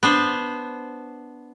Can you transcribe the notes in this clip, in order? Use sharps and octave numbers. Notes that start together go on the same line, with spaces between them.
B3 D4 C5